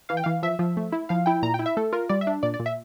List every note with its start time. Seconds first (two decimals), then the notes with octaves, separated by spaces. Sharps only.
0.09 E3 F5
0.17 G5
0.24 E3 F5
0.43 F3 E5
0.59 F3
0.77 A3
0.92 E4
1.09 F3 F5
1.26 E4 G5
1.43 A#2 A#5
1.54 G5
1.59 E4
1.66 E5
1.77 A3 A4
1.93 F4 A#4
2.09 G3 D5
2.21 E5
2.27 D4
2.43 A#2 D5
2.54 D5
2.60 A#2
2.66 E5